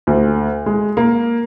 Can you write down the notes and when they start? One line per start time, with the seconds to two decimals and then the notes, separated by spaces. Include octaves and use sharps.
0.07 D2
0.66 G#3
0.97 A#3